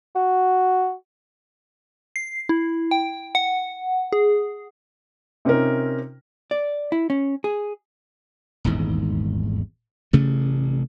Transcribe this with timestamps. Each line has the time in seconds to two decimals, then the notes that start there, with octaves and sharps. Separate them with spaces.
0.15 F#4
2.16 C7
2.49 E4
2.91 G5
3.35 F#5
4.12 G#4
5.45 C3 C4 C#4 D#4 F4 A#4
6.51 D5
6.92 E4
7.10 C#4
7.44 G#4
8.64 D#1 G#1 E2 G#2
10.13 A1 G2 C3 A3